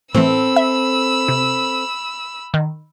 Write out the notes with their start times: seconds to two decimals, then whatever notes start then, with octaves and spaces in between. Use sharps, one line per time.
0.15 A2 E3 C4 A4 B5 E6
0.56 E5
1.28 C3
2.54 D#3